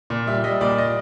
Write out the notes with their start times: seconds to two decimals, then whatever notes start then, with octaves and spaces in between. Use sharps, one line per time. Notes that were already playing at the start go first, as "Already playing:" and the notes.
0.10 A#2
0.27 G3 E5
0.44 G3 D#5
0.61 A#2 D5
0.78 D#5